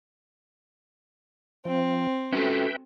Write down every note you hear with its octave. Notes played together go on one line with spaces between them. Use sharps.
F3 C4
C#4 F#4 A4 B4 E5 G5